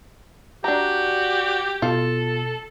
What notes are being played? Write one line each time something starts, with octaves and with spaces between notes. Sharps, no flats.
D4 F#4 G4 A#5
B2 F4 A4